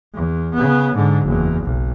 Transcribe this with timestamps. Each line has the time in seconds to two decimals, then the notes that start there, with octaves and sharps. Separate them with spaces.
0.15 E2
0.54 C#3 B3
0.94 G#2 D3
1.25 F#1 E2
1.64 B1